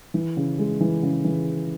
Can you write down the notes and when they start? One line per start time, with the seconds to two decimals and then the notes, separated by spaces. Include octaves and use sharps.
0.14 E3
0.37 C#3
0.59 G#3
0.81 E3
1.03 C#3
1.24 E3